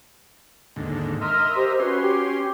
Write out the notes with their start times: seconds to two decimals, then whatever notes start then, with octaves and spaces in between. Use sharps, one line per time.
0.76 D#2 G#2 D3
1.21 A#4 D#5 E5 C6 F6
1.55 G4 C5
1.80 C#4 F#4 B4 C6
2.01 G4